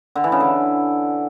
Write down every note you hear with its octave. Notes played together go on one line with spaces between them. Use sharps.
D3
E3
C#3
D3